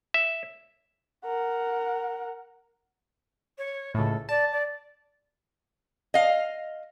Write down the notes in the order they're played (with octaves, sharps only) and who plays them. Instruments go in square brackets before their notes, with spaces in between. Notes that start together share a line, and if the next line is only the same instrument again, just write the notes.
[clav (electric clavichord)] E5
[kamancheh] A#4 F#5
[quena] C#5
[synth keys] C#2 A2 [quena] A4
[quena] D5 [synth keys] A5
[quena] D5
[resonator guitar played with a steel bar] D#5 F5